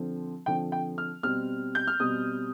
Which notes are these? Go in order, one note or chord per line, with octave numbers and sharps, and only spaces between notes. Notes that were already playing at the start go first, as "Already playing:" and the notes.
Already playing: D3 F3 C4
D3 F3 C4 G5
G5
F6
B2 G3 C4 F6
G6
F6
B2 G3 C4 D#6